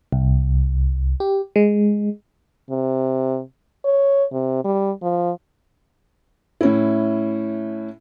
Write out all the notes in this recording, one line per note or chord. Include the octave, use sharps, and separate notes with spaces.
C2
G4
G#3
C3
C#5
C3
G3
F3
A2 C#4 E4